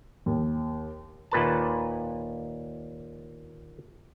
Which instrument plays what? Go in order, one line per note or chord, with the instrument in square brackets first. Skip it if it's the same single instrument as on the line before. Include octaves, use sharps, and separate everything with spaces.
[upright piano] D#2
[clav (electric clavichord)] D#2 A#2 B4 A5